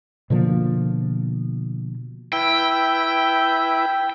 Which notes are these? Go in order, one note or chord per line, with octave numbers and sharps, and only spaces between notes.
B2 D3 F3 A#3
E4 B4 G5